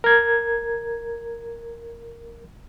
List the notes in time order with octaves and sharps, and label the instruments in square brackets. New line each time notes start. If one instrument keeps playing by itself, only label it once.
[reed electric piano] A#4 G#6